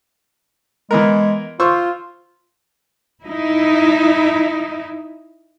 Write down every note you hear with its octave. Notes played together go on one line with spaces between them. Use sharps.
E3 G#3 B3 A#4
F4 C5 C#6 E6
D#4 E4